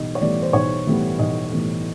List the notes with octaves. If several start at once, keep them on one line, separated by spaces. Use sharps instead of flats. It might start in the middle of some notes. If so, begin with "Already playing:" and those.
Already playing: B1 E3 G3 B3 D#5
C#5
A2 E3 G3 B3 D5
C5
B1 C#5
A2 E3 G3 B3
B1 D#5
A2 E3 G3 B3